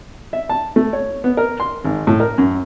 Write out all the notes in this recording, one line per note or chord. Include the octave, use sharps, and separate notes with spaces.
E5
A5
A3
C#5
B3
A#4
C6
G#1
A2
A#4
F#2